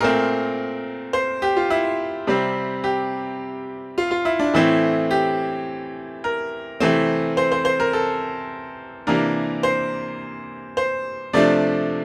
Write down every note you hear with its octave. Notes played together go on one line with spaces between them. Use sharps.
A#2 A3 C4 A#4
C5
G4
F4
E4
C3 G3 C4
G4
F4
F4
E4
D4
A2 E3 A3 C4 E4
G4
A#4
C3 E3 A3 C4
C5
C5
C5
A#4
A4
C3 E3 A#3 D4 A#4
C5
C5
C3 F3 A3 D4 D5